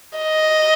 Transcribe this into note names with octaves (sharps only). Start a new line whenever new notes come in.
D#5